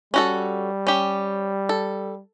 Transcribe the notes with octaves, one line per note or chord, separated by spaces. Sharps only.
G3 C#4 F#4 A4
C#4 G4
A4